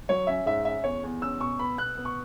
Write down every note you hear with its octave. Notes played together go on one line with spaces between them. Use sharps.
F#3 C#5
C#4 E5
G#2 E5
C#4 E5
E2 C#5
E2
C#4 E6
B2 C#6
B3 B5
B2 F#6
B3
C#6